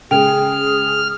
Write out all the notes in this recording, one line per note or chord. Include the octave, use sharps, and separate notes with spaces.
C#3 G#3 G#4 G5 F6